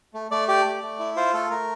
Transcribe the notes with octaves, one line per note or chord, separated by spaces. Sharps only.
A3
A3 D5
G4 D5
A3
A3
E4
F4 C5
A3 A4
A3 A#4